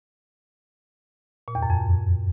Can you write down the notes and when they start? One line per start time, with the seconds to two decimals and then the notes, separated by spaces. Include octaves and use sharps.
1.48 A#2
1.55 E2
1.63 F#2
1.70 F2